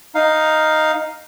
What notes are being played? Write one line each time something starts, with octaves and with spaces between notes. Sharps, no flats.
D#4 F5